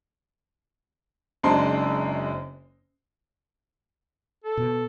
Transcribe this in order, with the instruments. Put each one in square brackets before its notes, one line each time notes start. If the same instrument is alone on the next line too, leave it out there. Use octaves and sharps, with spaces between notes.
[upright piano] F#1 F#2 G#3 C4 D4 C6
[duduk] A4
[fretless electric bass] B2